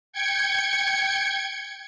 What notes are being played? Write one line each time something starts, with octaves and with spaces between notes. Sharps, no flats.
G5 G#6 C#7